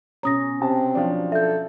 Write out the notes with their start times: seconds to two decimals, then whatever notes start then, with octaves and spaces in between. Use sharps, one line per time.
0.23 B2 C#4 C#5 A#5 D#6 A#6
0.61 C3 C4 A5
0.95 F3 F#3 D4
1.32 A4 E5 G6